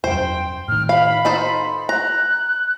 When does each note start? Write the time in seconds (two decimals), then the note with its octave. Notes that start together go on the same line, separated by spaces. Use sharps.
0.04 E1 F#2 C5 G5
0.68 A2 D#3 F6
0.89 F5 B5
1.25 D#4 A4 C5
1.89 A#5 F#6